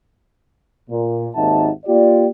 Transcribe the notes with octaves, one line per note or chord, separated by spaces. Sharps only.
A#2
G#1 D#2 D#4 E5 F#5 A5
A#3 F4 G4 D5